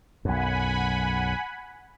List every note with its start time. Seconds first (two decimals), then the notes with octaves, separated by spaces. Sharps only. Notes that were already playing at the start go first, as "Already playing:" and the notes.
0.25 B1 F#2 F#5 G#5 B5